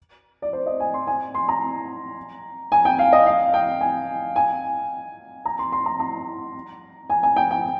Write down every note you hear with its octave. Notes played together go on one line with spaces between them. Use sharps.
D5
C5
D#5
G#5
C6
G#5
C6
A#5
G#5
G5
F5
D#5
F5
G5
G#5
G#5
A#5
C6
C6
A#5
A#5
G#5
G#5
G5
G5